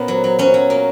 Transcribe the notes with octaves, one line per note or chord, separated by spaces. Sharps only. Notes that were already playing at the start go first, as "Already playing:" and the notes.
Already playing: A#2 A#3 B3 C#4
F#3
F#3
F#3 C#4
F#3
A#3